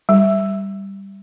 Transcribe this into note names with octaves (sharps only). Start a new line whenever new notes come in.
G3